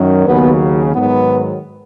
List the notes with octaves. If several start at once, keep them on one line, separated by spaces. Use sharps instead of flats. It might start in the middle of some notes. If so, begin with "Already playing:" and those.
Already playing: F#2 D#3 F#3
D#2 C#3 F#3 B3
G#2 D#3 F#3 B3